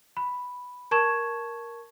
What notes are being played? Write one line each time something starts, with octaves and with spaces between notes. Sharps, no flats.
B5
A#4 A5 C#6 G#6 E7